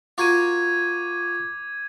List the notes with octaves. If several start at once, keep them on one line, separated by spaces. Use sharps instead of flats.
F4 F#4 A#4 D6 G#6 D#7